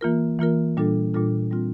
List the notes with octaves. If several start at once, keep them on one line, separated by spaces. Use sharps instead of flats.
E3 A#3 F4 A#4
E3 A#3 F4 A#4
A#2 G3 D4 F4 A4
A#2 G3 D4 F4 A4
G3 C4 F4